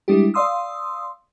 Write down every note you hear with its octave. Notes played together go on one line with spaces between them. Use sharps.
G3 G#3 D4 E4 G4
D5 F5 C6 D#6 E6